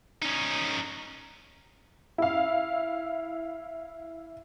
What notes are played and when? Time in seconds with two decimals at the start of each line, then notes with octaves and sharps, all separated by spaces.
0.22 C#4 D#4
2.18 E4 F5